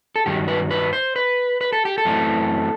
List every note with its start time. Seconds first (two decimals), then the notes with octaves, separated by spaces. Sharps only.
0.16 A4
0.26 G2 D#3 F#3 G4
0.48 B4
0.71 B4
0.93 C5
1.16 B4
1.61 B4
1.73 A4
1.85 G4
1.98 A4
2.05 F#2 E3 A3 C4